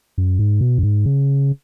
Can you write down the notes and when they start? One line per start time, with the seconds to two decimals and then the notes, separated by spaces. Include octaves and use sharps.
0.18 F#2
0.39 G#2
0.61 B2
0.78 F#2
0.83 G#2
1.06 C#3